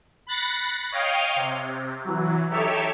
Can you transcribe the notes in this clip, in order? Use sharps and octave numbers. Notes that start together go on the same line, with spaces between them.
B5 F#6 A6 A#6 C7 C#7
C#5 D#5 F5 G5
C3
E3 F#3
D#4 G4 A4 C#5 E5